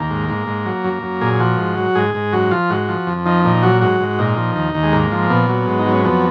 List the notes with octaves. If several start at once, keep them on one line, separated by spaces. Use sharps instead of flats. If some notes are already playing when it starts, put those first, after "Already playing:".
Already playing: D#2 A#3
G#2
G#2
G#2
F#3
F#2
F#2
A#2 G#4
F3 F#4
G#2
F#3
G#2 G#4
G#2
F#2 F#4
F3 F4
G#2 F#4
F3
F2
F3 D#4
A#2 D#4
F#3 F#4
G#2 F#4
G#2
A#2 D#4
F3
D#2
D#2
G#3
G#2 A#3
F3
A#2 B3
F#3
G#2
D#4
F#3
C#4
F2 B3